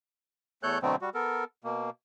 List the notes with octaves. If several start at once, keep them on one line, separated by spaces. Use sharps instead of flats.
E2 A3 A4 C#5 F#6 G6
B2 D3 F#3 A3 B3 C4
G3 F#4
B3 A4 A#4
B2 A#3